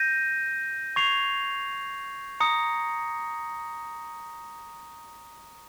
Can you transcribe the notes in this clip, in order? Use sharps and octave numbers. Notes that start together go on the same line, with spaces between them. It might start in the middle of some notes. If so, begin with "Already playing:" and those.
Already playing: G6 A#6 D#7
C#6 G#6 C7 F7
A#5 D#6 A#6 C#7